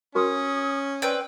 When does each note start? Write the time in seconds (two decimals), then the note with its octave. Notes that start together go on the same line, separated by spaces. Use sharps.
0.15 C#4 F#4 A#4 C6 D#6
1.02 C4 B4 D5 G5